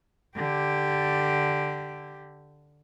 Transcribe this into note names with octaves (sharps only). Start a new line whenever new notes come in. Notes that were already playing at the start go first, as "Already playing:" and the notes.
D3 G4